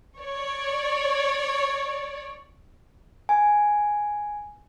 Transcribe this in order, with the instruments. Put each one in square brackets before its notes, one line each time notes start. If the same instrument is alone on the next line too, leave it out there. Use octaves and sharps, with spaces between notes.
[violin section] C#5 D5
[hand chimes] G#5